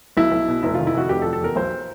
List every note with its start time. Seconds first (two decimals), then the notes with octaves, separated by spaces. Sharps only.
0.17 B1 E4
0.32 B1
0.48 B2
0.63 F1 E4
0.74 D#3 F4
0.87 E4
0.95 F2 F#4
1.09 F1 G4
1.22 A4
1.25 F3
1.33 A4
1.41 E2 A#4
1.56 B1 C5